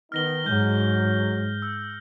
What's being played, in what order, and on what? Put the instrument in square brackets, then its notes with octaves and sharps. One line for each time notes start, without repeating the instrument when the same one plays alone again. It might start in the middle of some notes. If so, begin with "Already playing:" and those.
[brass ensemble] D#3 B3 D#4 [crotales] F6 A#6 G7
[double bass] G#2 [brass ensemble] F#3 G#3 [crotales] G6
[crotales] E6